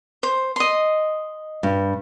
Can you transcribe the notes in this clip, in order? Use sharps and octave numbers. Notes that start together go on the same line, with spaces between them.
C5
D#5 C6
G2